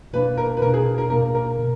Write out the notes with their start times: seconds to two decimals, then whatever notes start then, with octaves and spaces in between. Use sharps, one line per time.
0.13 B2 A#3 D4 B4
0.37 A#4
0.57 B4
0.62 B2 A#3 D4 A#4
0.74 G#4
0.98 A#4
1.10 B2 A#3 D4 A#4
1.35 A#4
1.59 B2